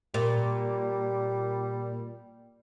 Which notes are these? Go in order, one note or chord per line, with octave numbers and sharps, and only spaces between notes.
A#2 G3